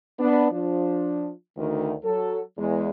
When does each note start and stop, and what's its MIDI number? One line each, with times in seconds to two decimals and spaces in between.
0.19 0.49 59
0.19 0.49 62
0.51 1.30 53
0.51 1.30 62
1.57 1.93 38
1.57 1.93 51
2.05 2.40 54
2.05 2.40 69
2.58 2.89 40
2.58 2.89 56